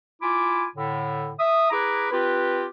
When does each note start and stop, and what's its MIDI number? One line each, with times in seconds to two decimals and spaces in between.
0.22 0.64 64
0.22 0.64 65
0.22 0.64 80
0.22 0.64 86
0.76 1.32 45
0.76 1.32 50
1.40 1.70 76
1.40 1.70 87
1.71 2.08 64
1.71 2.08 68
1.71 2.08 71
1.71 2.08 82
1.71 2.08 86
2.11 2.65 60
2.11 2.65 65
2.11 2.65 67
2.11 2.65 71